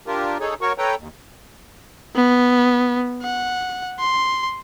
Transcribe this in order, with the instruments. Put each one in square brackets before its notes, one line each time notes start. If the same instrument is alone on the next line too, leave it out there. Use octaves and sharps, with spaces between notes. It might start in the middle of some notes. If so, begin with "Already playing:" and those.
[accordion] D4 F4 G4 A#4
D#4 G#4 A4 C#5
F#4 A#4 C#5 C#6
A4 B4 C#5 G5 A#5
D#2
[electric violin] B3
F#5
C6